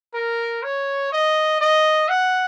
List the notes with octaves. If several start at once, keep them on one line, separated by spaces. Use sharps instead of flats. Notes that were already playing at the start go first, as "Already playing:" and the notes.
A#4
C#5
D#5
D#5
F#5